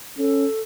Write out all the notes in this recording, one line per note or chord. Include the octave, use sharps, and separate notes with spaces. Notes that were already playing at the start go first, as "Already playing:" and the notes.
C#4 A4